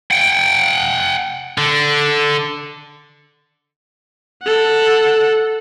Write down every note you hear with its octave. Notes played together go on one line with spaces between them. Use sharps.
F#5 G5
D3
A4 F#5